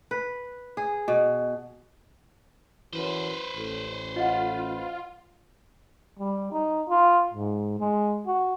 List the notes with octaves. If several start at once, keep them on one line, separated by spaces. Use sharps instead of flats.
B4
G#4
B2
F#2 E3 B4 C5
A1
F4 D#5 F#5
G3
D#4
F4
G#2
G#3
F#4